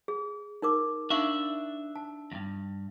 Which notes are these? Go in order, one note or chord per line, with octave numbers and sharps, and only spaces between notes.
G#4
D#4 A#4 D6
D4 D#4 E5 F5 C#6
A5
E2 G2